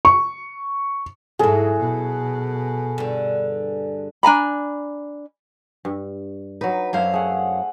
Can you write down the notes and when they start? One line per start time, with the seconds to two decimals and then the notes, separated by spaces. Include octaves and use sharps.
0.05 C#6
1.39 G#2 F#3 E4 G#4 A4
1.79 B2
2.98 G2 D3
4.23 D4 G#5 A#5 B5
5.85 G2
6.61 F#3 D#4 B4
6.93 F#2 F#3 D4 E4 C5 F5
7.14 A3 G#4 F#5